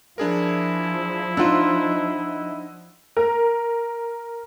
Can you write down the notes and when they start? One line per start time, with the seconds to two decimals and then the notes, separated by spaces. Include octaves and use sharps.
0.18 F3 D4 E4 G#4 A#4
1.37 D4 D#4 F4 D#5 F#5 E6
3.17 A#4